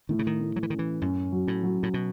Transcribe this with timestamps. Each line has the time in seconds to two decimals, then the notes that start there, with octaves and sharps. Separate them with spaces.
0.09 A2 D#3
0.19 C#3
0.27 D#3
0.41 A2
0.56 F#3
0.63 E3
0.70 D#3 C#4
0.79 E3
1.01 F#2 C#4
1.32 F#3
1.48 A2
1.63 F#3
1.83 A2
1.94 B2